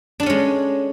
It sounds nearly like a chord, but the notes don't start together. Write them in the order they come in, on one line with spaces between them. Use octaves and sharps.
D4 A4 C#4 G#3